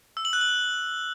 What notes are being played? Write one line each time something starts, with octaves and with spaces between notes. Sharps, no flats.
E6
F#7
F#6
F#7